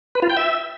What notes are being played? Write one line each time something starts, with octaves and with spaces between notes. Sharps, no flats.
B4
F4
G5
E5